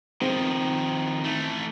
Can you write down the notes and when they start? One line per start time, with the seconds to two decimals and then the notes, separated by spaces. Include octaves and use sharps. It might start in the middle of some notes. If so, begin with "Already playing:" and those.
0.21 D#3 F3 C4
1.24 E3 A3